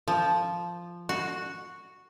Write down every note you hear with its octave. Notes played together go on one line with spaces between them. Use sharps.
F3
F#4